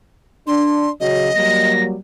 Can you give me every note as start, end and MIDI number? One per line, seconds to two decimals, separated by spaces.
0.47 0.90 62
0.47 0.90 84
1.00 1.29 49
1.00 1.29 54
1.00 1.72 75
1.36 1.95 54
1.36 1.95 55
1.36 1.95 58
1.36 1.82 94